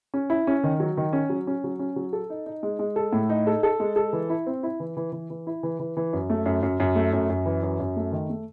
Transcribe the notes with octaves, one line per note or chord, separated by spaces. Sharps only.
C#4
E4
C#4
D#3
F#3
D#3
C#4
F#3
C#4
F#3
C#4
F#3
A4
D#4
D#4
G#3
G#3
A4
A2
D#4
A4
A4
G#3
A4
E3
E4
C4
E4
E3
E3
E3
E3
E4
E3
E3
E3
F#2
A3
F#2
F#2
F#2
A3
F#2
F#2
E3
F#2
F#2
A3
D#3
A3